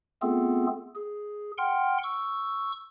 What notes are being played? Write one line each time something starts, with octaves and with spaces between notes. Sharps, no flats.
A3 B3 C4 F4 G#4 A4
G#4
F#5 G5 C6 F6
C#6 E6